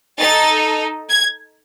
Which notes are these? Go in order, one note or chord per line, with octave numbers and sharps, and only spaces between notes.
D#4 A4 A6
G#6